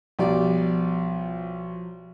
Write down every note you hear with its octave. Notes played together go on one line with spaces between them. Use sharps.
B1 F3 G3 D5